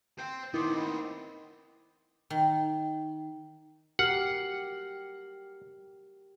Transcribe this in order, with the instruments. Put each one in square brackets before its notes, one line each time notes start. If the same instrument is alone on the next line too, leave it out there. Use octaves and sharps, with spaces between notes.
[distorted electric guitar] C5 G5 [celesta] G6
[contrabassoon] D#3 [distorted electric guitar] B3 C4 [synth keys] E4 [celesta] C6 D6 D#6
[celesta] D#5 B5
[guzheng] D#3
[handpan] F#4 G4 A#4 [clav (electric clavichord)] F#5 [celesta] F6 C7